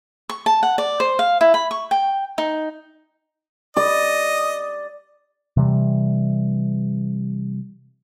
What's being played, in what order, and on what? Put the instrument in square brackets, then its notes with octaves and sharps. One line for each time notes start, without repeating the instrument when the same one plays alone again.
[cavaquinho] C#6
A5
F#5
D5
C5
F5
E4
B5
C#6
G5
D#4
[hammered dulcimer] D5 [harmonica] D#5
[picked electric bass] C3 E3 G3